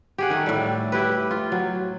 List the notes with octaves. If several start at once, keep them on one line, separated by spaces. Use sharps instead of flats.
G4 G#4 F#5
D#3 A3
A2 G3
E4 G4 B4
F4
F#3